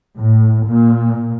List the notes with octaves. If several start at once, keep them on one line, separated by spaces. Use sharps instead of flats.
A2
A#2